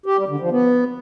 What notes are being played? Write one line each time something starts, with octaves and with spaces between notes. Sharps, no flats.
G4
G3
D3
F3
B3